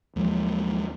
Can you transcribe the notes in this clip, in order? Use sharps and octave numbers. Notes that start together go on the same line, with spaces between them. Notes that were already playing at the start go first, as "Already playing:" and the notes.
D#2 F3 F#3 G#3